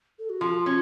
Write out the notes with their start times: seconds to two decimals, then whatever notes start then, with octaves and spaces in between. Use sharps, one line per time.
0.19 A4
0.30 F#4
0.40 F3 F4
0.66 C#4